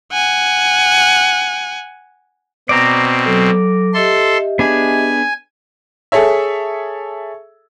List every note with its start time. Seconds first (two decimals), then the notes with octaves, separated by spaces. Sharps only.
0.12 F#5 G#5
2.69 B2 C4 D5 A#5
3.25 F#3 A4
3.94 G4 A4 D#5 E5 C6
4.59 B3 D4 G#4 G#5
6.12 G#4 A4 C#5 E5